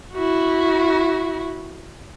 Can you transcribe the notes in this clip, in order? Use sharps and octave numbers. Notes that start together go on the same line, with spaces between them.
E4 F#4